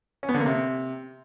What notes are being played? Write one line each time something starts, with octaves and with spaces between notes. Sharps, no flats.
C#4
B3
D3
A#3
C3